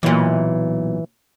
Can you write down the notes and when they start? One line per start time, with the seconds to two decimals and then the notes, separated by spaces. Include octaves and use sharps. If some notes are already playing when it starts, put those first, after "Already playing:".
0.03 B1 A#2 E3